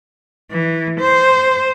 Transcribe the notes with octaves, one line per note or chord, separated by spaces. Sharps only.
E3
C5